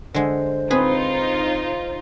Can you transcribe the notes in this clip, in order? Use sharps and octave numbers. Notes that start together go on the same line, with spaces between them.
D3 G#3 C5
C4 D#4 F4 G#4 B4